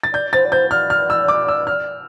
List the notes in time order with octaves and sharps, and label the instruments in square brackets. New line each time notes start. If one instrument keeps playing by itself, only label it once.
[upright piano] A6
[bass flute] D5 [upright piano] G6
[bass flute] C5 [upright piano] A6
[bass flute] D5
[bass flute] C5 [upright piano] G6
[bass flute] D5 [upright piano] F6
[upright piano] F6
E6
D6
E6
F6